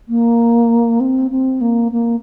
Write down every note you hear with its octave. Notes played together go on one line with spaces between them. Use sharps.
A#3
C4
C4
A#3
A#3